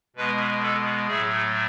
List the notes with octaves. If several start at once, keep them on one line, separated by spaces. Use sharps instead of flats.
B2 G#3 B3 B4
A4
A2 F#3 A3 G#4